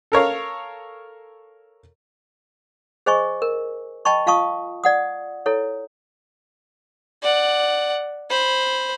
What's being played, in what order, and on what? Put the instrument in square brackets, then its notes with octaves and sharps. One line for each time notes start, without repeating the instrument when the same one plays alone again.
[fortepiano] A4 A#4 C#5 F5
[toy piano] G#4 C5 D#5 G#5 C#6
A#4
D#5 G5 A5 B5 C#6
F4 F5 A5 C#6 D#6
D5 F#5 D#6
E4 A4 C#5
[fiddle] D5 F#5
C5 B5